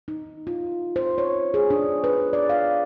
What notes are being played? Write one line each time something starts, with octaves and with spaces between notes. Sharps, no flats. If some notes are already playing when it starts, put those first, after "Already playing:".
D#4
F4
C5
C#5
G#4
D4
B4
D5
F5